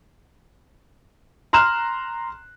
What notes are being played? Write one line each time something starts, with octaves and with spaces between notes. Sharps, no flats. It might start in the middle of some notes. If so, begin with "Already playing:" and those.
A#5 C6 F6 F#6 E7